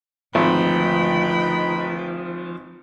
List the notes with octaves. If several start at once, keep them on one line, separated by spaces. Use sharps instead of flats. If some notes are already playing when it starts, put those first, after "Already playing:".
G#1 D2 F3 D#4 B4 G5 B5